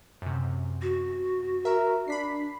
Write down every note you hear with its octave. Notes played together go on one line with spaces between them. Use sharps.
F#2 C3
F#4
A#4 E5
D4 B5 B6 C7